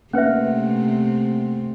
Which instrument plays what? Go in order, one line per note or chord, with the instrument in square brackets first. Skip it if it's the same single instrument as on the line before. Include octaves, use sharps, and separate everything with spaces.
[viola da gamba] C3 A3 C4 [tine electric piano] A#3 F#5 [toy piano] C#4 B4 E5